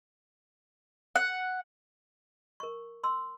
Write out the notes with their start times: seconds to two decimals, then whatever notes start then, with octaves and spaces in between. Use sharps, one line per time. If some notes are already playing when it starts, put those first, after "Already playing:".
1.16 F#5
2.60 A#4 C#6
3.04 C6 E6